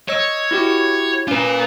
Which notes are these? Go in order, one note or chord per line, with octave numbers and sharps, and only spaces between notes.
C#5 D#5 E6
E4 F#4 G4
C#4 F4 A#4 B4